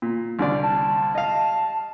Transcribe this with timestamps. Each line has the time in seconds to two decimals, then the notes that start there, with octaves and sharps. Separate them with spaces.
0.02 A#2
0.39 C2 D3 D5
0.63 A5
1.15 D#5 F5